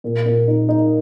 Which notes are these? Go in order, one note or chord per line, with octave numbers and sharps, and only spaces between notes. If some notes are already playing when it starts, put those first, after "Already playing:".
A#2
A#2
D#4
D#4